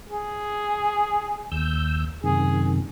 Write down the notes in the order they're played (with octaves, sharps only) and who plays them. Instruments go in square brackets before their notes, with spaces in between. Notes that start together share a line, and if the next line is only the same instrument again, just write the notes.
[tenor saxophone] G#4
[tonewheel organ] D#2 E6 G6
[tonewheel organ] F#2 C3 D#3 [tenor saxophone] G#4